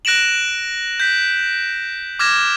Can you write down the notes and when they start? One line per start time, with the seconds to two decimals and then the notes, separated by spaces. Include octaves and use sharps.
0.05 F#6 A#6 D7 E7 F#7
1.00 G6 B6
2.19 D6 F6 G#6 A#6 E7